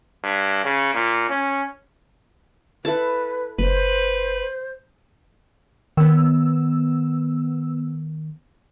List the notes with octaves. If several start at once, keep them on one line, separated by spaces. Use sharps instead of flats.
G2
C#3
A#2
C#4
E4 A4 B4 A5
F#1 B4 C5
D#3 B3 E6